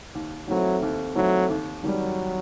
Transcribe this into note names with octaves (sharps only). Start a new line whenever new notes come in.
D#2
D#3 F#3 A3 C4 E4
D#2
D#3 F#3 A3 C4 E4
D#2
D#3 F#3 G3